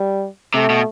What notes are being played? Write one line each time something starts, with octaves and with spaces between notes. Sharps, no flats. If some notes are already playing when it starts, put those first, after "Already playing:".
Already playing: G3
C3 A3
B2